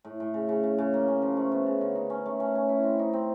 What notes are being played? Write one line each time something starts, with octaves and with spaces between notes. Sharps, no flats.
A2
A2
C#3
C#3
C#3
C#3
A#3
C#4
F3
A3
B3
C#3
D3
D#4
C#4
A3
C#4
C#4
E4
C4
D#4
C4